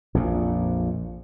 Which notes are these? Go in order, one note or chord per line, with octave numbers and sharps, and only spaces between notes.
A#1 F2 A#2